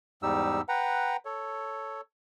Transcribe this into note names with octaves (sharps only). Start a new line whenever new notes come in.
E2 G#2 G3 D#4 G4 E6
B4 F#5 G5 A#5
A4 C#5